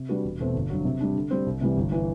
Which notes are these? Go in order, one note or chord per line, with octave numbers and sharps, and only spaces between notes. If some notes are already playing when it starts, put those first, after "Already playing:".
Already playing: C3
G3 D4 F#4 B4
E1
E2 B2 A3 C4
G1
G2 F#3
C3
G3 D4
D3
G3 C4
C2
C3 E3 G3
G1
E3